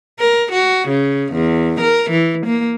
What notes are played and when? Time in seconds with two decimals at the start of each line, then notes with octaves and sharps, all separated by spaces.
0.19 A#4
0.52 F#4
0.89 C#3
1.33 E2
1.81 A#4
2.11 E3
2.46 A#3